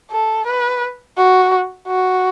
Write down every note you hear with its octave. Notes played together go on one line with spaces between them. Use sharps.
A4
B4
F#4
F#4